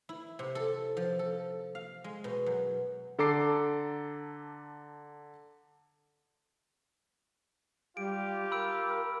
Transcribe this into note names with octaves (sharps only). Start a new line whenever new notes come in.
E4
C3
A4
F3
A4
F5
G#3
B2
F#2
D3 A4 A#5 D6 C7
G3 F4 G4 D7
A#4 B5 E6 D7